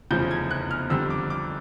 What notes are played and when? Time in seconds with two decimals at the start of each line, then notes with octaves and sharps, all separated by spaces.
0.11 F1 E2 C#3 F3 G6
0.31 G#6
0.51 F#6
0.71 F6
0.90 F2 D3 G3 E6
1.10 D6
1.30 D6